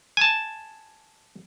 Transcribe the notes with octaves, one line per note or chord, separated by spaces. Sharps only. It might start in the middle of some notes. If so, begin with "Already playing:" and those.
G#5 A5